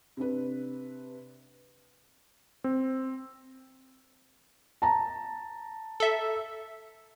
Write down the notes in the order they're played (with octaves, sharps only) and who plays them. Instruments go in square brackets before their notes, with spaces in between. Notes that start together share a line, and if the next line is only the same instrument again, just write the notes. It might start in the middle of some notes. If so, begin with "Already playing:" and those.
[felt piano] C3 D4 B4
[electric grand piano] C4
[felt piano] A5 A#5
[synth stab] A4 E5